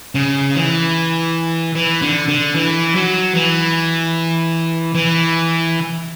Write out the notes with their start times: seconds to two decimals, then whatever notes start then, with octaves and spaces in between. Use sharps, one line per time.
0.15 C#3
0.55 E3
1.75 E3
2.02 D3
2.28 D3
2.55 E3
2.95 F#3
3.35 E3
4.95 E3